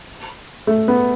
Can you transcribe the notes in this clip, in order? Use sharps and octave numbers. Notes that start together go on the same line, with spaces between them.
A3
B3